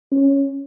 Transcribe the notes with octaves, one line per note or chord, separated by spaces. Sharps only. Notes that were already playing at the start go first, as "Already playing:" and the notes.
C#4